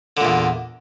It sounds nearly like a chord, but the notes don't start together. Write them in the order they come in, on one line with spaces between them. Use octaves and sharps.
D3 A#2 E2